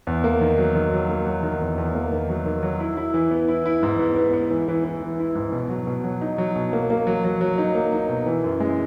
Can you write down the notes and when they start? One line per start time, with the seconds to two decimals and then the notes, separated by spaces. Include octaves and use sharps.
0.07 E2
0.24 A#3
0.41 D#3
0.58 F#3
0.75 D#3
0.93 F#3
1.09 A#3
1.26 F#3
1.43 D#3
1.61 E2
1.78 E2
1.95 A#3
2.12 D#3
2.29 F#3
2.46 D#3
2.63 F#3
2.80 E4
2.97 E4
3.14 E3
3.31 B3
3.48 E4
3.66 E4
3.83 G#2
3.99 B3
4.16 B3
4.33 B3
4.51 E3
4.68 E3
4.85 E3
5.02 E3
5.19 E4
5.35 G#2
5.52 B2
5.70 F#3
5.87 B2
6.04 F#3
6.21 D#4
6.38 F#3
6.56 B2
6.73 A#3
6.90 A#3
7.07 F#3
7.24 F#3
7.41 F#3
7.58 D#4
7.75 A#3
7.92 D#4
8.09 B2
8.26 E3
8.44 F#2
8.60 G#3